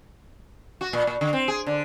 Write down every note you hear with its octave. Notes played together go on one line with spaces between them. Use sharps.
F#4
A#2
A#2
D3
C4
G#4
D3